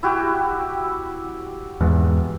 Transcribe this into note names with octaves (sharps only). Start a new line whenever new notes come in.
E4 F#4 G4
E2 G#2